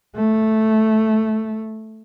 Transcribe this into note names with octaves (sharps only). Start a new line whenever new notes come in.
A3